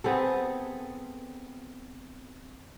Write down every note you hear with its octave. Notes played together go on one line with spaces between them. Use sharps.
B3 C4 G#4 A4